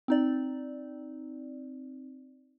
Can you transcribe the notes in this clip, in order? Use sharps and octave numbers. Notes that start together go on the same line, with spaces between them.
C4 D#4 D5